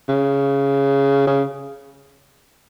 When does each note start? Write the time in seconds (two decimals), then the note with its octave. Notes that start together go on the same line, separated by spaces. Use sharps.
0.09 C#3
1.27 C#3